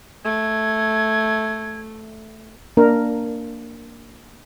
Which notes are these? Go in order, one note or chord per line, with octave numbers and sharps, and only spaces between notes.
A3 G#6
A#3 D4 A#4